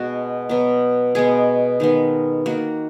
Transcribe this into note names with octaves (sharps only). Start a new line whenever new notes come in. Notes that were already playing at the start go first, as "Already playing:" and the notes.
Already playing: B2 G#3 B3 F#4
B2 F#3 B3
B2 G#3 B3 G#4
D#3 G#3 B3
D#3 A#3 F#4